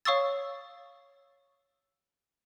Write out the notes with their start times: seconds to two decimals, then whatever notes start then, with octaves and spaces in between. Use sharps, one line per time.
0.05 C#5 F5 C#6 D#6 E6 A6